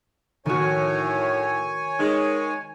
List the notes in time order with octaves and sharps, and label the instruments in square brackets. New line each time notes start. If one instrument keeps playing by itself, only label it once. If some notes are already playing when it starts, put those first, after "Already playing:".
[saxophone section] A2 [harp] D#3 F#4 [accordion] C#5 G#5
[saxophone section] D#3 G#3